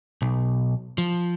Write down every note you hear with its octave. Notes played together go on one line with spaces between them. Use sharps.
B1
F3